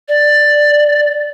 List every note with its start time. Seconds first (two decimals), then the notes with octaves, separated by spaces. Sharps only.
0.08 D5